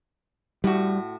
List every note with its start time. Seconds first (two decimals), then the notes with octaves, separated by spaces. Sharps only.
0.64 A2 G3 F#4